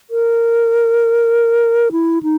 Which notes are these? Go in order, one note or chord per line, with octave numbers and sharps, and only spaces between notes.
A#4
E4
D#4